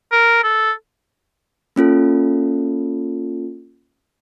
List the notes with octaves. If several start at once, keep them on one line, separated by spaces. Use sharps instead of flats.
A#4
A4
A#3 C#4 F4 A4